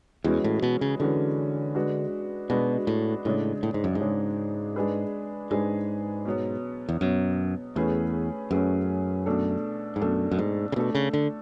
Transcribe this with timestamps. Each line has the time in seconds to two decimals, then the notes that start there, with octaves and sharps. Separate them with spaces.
0.24 E2 E3 G#3 C#4 F#4 B4
0.44 A2
0.62 B2
0.81 C#3
1.00 D3 E3 G#3 C#4 F#4 B4
1.75 G#3 D4 F#4 B4
2.50 B2 G#3 D4 F#4 B4
2.87 A2
3.25 A2 C#3 G#3 D4
3.63 A2
3.74 G#2
3.84 F#2
3.95 G#2
4.01 C#3 G#3 D4
4.76 G#3 D4 G#4 B4
5.51 G#2 G#3 D4 G#4 B4
6.25 B2 F#3 B3
6.89 E2
7.01 F#2 B2 F#3 B3
7.76 E2 A3 C#4 G#4 B4
8.51 F#2 A3 C#4 G#4 B4
9.26 B2 A3 D4 A4
9.96 G#2
10.01 F#2 B2 A3 D4 A4
10.31 F#2
10.39 G#2
10.72 C#3
10.76 B2 A3 D4 A4
10.95 C#3
11.13 D3